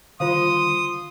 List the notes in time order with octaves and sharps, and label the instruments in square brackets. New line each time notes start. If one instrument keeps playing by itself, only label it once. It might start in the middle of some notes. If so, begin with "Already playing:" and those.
[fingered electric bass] D3 D#3 G3 [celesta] F4 C5 F5 [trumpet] C6 [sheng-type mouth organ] D#6